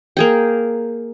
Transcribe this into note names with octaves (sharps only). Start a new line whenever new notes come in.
A#3 G#4 G5